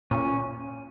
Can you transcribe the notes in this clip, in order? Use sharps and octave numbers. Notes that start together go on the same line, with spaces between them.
A#2 C#4